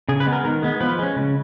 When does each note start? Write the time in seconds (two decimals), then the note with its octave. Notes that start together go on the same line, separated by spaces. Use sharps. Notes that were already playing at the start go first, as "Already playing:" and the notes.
0.09 C#3 G#4
0.20 B4
0.26 G#3 B3
0.32 A#4
0.44 D#3 A#4
0.62 G#3 B3
0.80 F3 B4
0.99 G#3 C#4
1.16 C#3